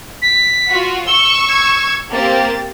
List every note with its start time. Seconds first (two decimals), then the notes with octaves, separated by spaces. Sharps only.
0.22 B6
0.69 F4 F#4
1.07 C#6 E6 G7
1.49 G#6
2.13 A#3 C4 G4 A6